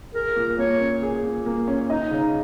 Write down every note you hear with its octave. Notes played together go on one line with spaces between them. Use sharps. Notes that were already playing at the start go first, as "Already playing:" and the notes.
G#4 A#4
A#2
A#3 C#5
C#4
G#4
A#2
A#3
C#4
D#4 D#5
C#3